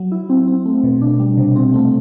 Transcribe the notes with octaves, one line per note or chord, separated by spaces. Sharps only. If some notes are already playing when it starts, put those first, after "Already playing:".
Already playing: F#3
E4
C4
C4
A3
B2
D4
G3
C3
C4
A3